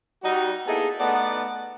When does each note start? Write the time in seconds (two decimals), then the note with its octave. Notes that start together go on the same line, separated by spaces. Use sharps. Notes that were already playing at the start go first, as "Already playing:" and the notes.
0.23 G3 D#4 F#4
0.66 A#3 B3 D#4 E4 G#4 A4
0.99 A3 B3 D#4 D5 F#5 A5